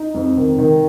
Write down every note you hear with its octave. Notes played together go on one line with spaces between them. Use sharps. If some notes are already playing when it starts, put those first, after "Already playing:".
Already playing: D#4
F2
D#3
D#3